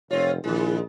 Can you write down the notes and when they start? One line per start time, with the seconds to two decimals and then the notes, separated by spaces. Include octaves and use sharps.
0.11 F1 C4 F4 C#5
0.44 A#1 D#3 G#3 E4